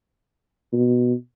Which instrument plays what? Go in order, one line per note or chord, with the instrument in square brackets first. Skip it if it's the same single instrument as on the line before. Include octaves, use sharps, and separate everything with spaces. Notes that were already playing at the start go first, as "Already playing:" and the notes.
[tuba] B2